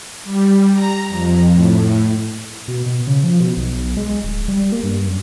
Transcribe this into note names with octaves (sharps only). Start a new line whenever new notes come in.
G3
A#5
F2
A2
B2
B2
C#3
F3
B2
B1
G#3
D1
G3
A#3
G2
F#2